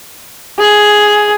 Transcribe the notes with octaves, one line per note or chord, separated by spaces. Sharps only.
G#4